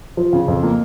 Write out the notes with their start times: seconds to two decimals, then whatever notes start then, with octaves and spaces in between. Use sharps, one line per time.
0.17 F3
0.33 C#3
0.48 F2
0.63 A#3